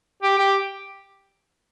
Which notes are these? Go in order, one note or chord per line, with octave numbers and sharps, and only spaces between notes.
G4
G4